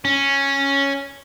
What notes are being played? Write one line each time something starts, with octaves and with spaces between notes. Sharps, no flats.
C#4